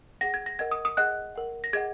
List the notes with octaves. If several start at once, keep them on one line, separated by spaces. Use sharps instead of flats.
G#4 F#5 A#6
G#6
A#6
A#4 D#5 F#5 G#6
D#6
D#6
G#4 D#5 F#5 F#6
A#4 F#5
A#6
G#4 D#5 F#5 G#6